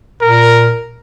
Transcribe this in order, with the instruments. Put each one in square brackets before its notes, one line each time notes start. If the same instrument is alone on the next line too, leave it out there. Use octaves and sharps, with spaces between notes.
[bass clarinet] A#2 [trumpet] A#4